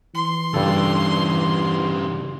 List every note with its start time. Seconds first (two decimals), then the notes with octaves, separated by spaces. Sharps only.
0.15 E3 C6
0.54 G2 C#3 G3 A4